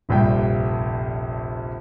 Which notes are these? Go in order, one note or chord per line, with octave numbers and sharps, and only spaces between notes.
F1 A#1 G2 G5